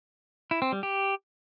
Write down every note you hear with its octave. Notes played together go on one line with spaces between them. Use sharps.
E4
C4
G3
G4